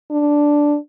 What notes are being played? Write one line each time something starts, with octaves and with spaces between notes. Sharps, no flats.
D4